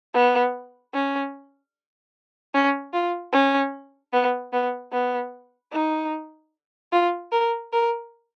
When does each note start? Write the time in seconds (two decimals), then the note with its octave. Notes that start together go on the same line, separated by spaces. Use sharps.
0.14 B3
0.94 C#4
2.54 C#4
2.93 F4
3.33 C#4
4.13 B3
4.53 B3
4.92 B3
5.72 D#4
6.92 F4
7.32 A#4
7.73 A#4